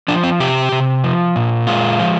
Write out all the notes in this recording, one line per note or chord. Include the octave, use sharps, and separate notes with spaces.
F3 D4
C4
C3 G4
C3
F3
A#2
G#3 F4
F3